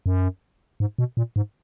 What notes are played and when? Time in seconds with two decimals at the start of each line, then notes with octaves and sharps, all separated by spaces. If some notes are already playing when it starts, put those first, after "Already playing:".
0.06 F#2
0.80 G#2
0.99 B2
1.17 A#2
1.36 G#2